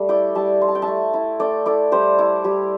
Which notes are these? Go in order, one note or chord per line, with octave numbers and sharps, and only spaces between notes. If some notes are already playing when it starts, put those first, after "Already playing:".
Already playing: G3 A3 E5
E4 D5 G5
G3 E5 A5
E4 C6
A5
G5
E5 A5
A3
E4
A3 D5 G5
E4 A4 D5
G3 G4 C5
E4
G3 G4